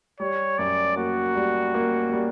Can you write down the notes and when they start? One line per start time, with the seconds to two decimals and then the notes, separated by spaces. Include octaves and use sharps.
0.20 G3 C#5
0.58 F#2 D5
0.96 A#3 F#4
1.35 G3
1.74 A#3
2.12 G3